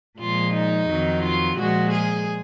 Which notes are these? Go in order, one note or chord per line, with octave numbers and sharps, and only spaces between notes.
A#2 F3 G#3 F4
D#4
F2 D#3 F#3
F4
A#2 F3 G#3 F#4
G#4